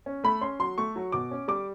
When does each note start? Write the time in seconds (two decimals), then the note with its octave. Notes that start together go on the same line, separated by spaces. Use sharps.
0.06 C#4
0.24 A3 B5
0.41 C#4 C6
0.60 F#3 C6
0.78 A3 C#6
0.96 F#3
1.12 B2 D6
1.31 C#4
1.48 G3 D6